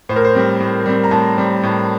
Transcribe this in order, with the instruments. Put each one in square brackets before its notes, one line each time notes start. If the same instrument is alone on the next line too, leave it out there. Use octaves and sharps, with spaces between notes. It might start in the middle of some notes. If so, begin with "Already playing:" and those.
[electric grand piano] A2 C5
A#4
C5
G3 C4
A2
G3 C4
A#5
A2 A5
G3 C4
A2